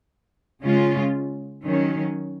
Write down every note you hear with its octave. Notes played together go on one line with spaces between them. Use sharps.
C#3 G#3 C#4 F4
D#3 F#3 C#4